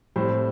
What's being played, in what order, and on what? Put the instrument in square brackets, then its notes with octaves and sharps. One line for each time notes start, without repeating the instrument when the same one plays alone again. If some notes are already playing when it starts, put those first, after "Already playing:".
[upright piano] A2 G3 C4 C5